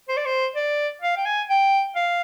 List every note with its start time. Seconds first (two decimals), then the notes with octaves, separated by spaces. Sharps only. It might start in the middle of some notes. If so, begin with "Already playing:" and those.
0.09 C5
0.17 D5
0.26 C5
0.55 D5
1.02 F5
1.17 G5
1.25 G#5
1.49 G5
1.96 F5